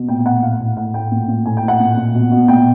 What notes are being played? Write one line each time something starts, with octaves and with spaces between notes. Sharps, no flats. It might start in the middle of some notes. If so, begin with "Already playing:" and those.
Already playing: B2
A#2 G5
G5
A#2 F#5
A2 F5
A2
A2 F#5
A2 G5
A#2
A#2
A2 G#5
G5
A2
F#5
A#2
A#2
B2
B2
A#2 G5